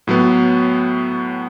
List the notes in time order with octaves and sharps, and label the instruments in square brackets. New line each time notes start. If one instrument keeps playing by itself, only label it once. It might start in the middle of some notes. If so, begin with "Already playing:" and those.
[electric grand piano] A2 F#3 B3